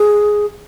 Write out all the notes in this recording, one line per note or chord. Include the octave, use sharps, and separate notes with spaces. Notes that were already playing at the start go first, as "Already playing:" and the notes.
Already playing: G#4